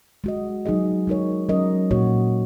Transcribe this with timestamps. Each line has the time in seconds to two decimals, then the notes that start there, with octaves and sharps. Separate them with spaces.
0.24 G#3 F#4 D#5
0.66 F#3 D#4 G#4 D#5
1.07 G#3 D#4 F#4 A#4 C#5
1.49 F#3 C#4 A#4 D#5
1.91 A#2 A#3 F#4 C#5